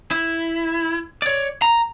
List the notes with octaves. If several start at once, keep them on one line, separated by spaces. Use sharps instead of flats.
E4
C#5 D5
A#5